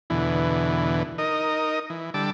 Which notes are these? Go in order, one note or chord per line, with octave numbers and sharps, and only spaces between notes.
E2 B2 D3 E3
D#4 A#4 D#5
E3
D3 G3 A5 D6 E6